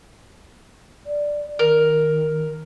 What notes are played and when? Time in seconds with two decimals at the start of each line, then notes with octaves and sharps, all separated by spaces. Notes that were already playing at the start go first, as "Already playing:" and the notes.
1.06 D5
1.59 D#3 A#4